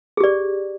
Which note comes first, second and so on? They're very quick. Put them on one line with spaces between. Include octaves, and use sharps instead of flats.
G#4 G4 D5